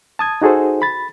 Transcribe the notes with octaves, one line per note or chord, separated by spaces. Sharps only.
A5 D#6 G#6
D#4 F#4 G#4 A4 C5
B5 A6